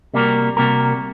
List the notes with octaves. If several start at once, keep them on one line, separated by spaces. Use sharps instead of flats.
C3 G3 A#3 F#4 A#4
C3 G3 A#3 F#4 A#4